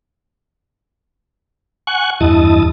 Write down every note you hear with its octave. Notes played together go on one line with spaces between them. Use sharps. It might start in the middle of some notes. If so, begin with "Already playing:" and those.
F#5 G#5 C#6 F#6
E2 G2 E4 D#5 A5 D#6